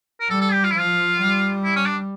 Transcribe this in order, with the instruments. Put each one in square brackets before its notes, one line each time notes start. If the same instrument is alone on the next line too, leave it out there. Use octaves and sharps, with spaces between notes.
[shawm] A#4
[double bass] G3 [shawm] A4
[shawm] A4
G4
F4
E4
[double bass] F3 [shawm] F4
[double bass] G3
[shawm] E4
C#4
D4